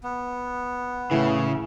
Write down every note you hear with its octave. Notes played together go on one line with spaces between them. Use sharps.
B3
A2 C#3 E3 E4